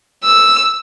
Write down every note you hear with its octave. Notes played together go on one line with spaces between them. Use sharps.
E6